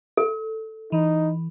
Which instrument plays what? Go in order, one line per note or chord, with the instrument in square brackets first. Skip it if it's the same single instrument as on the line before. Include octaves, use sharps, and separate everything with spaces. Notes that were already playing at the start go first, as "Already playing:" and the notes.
[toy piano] A4
[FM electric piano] E3 [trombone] D#4